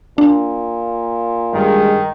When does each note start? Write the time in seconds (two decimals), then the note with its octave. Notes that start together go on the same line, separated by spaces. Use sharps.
0.18 A#2 D4
1.53 G2 D#3 G#3